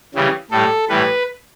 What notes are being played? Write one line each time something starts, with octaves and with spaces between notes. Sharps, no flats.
C#3 E3 G3
A2 G3 A4
A2 E3 G3 B4